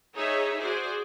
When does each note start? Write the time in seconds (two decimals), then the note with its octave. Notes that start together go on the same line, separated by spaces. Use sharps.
0.16 D#4 G#4 C#5 D#5 E5
0.59 F#4 G#4 C5 D5